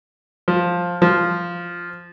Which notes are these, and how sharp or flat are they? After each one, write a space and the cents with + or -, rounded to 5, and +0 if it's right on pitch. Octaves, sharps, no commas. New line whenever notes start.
F3 +10
F3 -5